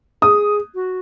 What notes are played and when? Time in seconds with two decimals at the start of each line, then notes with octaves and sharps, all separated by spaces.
0.22 G#4 D#6
0.75 F#4